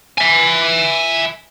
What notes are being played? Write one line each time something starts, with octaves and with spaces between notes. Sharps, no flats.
E5 G#5